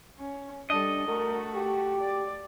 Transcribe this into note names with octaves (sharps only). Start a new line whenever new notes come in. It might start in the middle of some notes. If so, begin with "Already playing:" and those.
C#4
G3 D4 A4 D#5
A3 F#4 A#4
G4
D5